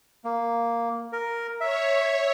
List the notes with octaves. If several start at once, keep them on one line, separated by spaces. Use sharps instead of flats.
A#3
A#4
C#5 E5